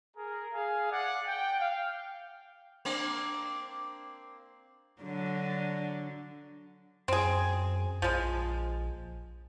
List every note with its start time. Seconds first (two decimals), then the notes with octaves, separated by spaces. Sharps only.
0.16 G#4 A#4
0.53 G#4 F5 G#5
0.91 D5 F#5 G#5
1.28 G5
1.60 F5
2.85 A#3 C4 D4
5.02 D3 F#3 D4
7.08 F#2 C4 G#4
8.02 A#1 F3 G#3